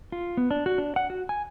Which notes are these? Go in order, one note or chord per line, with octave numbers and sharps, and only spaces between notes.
F4
B3
D4
F#4
D4
F#5
F#4
G#5